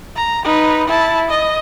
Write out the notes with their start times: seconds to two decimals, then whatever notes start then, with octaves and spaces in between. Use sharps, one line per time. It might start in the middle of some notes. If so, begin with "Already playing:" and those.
0.16 A#5
0.44 D#4 B4
0.88 E4 A5
1.29 D#5